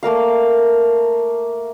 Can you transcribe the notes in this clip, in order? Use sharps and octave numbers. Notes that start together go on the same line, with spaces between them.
A3 A#3 A#4 F5